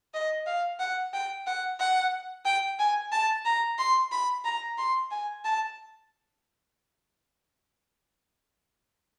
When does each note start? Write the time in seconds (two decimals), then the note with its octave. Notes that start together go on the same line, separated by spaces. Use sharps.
0.14 D#5
0.47 F5
0.80 F#5
1.13 G5
1.47 F#5
1.80 F#5
2.45 G5
2.79 G#5
3.12 A5
3.45 A#5
3.79 C6
4.12 B5
4.45 A#5
4.78 C6
5.11 G#5
5.45 A5